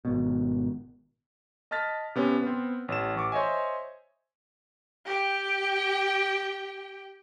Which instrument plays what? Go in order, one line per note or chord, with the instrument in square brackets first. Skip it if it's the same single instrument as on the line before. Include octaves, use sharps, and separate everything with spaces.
[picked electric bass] G#1 B2
[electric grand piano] D#5 A5 F6 A6 B6
C3 B3 C#4
B3 C4
A1 E7
A1 C#6 D6
C5 C#5 D#5 E5 G#5
[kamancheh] G4 G5